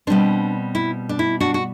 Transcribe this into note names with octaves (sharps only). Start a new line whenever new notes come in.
B2 G3 C4 D4
E4
D4
E4
D4 F#4
F#4